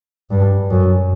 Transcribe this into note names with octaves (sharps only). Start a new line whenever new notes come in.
G2
F#2